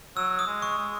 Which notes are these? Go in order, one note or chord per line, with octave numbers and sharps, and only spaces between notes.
F#3 E6
D#6
G#3
C#6
G#3